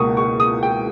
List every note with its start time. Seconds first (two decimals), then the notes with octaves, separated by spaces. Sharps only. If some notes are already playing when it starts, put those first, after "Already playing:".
Already playing: C#2 B2 A#3 C#6 D#6
0.17 C#6
0.40 D#6
0.63 G5